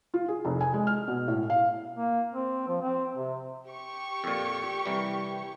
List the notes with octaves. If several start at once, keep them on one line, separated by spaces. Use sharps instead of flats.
F4
G#4
F1
G#5
G#3
F6
B2
A2
F5
A#3
C4
F3
C4
C3
G4 C#6
F2 A#2
C2 E3 G3